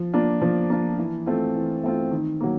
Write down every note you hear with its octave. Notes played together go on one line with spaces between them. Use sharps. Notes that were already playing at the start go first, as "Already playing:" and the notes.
Already playing: F3
A#3 D4 F4
F3
A#3 D4 F4
E3
A3 C4 F4
E3
A3 C4 F4
D#3
F#3 A#3